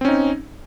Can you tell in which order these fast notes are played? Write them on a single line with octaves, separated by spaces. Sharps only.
C4 C#4 D#4